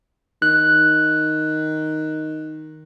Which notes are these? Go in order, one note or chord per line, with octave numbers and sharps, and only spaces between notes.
D#3 F#6